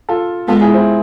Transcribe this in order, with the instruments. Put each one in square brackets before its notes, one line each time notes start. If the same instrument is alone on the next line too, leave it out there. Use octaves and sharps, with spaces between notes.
[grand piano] F4 A4
[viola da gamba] G#3 B3 [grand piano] F4 A4
[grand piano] E4 G#4
C4 E4